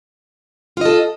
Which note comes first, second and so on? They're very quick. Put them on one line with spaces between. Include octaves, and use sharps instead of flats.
F4 D#5 A4